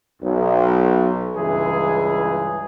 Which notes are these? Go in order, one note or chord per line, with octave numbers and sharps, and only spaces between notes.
B1
C#2 G2 E3 G#4